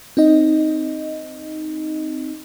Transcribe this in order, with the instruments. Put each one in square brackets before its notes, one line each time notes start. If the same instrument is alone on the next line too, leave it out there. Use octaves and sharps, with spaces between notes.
[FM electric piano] C4 D#4 D#5